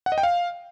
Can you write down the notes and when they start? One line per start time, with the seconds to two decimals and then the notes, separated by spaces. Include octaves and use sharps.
0.06 F#5
0.12 D#5
0.18 G5
0.23 F5